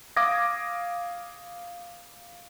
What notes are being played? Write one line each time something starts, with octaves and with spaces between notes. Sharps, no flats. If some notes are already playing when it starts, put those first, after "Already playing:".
F5 D6 D#6 G#6 A#6